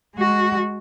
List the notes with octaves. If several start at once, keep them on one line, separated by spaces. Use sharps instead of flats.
G#3 F#4